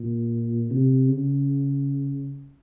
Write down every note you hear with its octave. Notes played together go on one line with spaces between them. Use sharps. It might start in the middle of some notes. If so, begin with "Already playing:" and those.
Already playing: A#2
C3
C#3